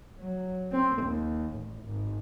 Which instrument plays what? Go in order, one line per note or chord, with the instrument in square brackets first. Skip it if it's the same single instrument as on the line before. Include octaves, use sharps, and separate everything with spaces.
[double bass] F#3
C4
D#2
A1
G#1